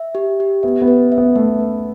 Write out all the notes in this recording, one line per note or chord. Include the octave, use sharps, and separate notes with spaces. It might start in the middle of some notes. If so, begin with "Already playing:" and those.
Already playing: E5
G4
G4
B3 E5
B3
B4
E5
B3
A3 B3
B4